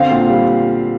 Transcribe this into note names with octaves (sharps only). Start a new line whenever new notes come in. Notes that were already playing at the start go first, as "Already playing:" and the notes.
Already playing: D3 C4 F5
A#2
G3